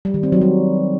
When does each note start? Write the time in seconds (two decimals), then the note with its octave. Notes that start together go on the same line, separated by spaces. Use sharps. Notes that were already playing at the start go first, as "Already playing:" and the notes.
0.05 G3
0.14 D#3
0.23 C4
0.32 F#3
0.41 G3